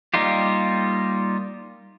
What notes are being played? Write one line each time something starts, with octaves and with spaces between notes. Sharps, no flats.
G3 A#3 D#4 F4 G4